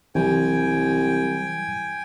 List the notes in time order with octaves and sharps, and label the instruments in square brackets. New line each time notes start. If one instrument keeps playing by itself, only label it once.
[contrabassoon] C2 [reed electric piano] E3 F#3 G3 [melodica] G5 G#5